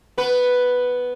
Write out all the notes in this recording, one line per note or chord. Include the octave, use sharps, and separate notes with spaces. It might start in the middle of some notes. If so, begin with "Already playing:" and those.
B3 B4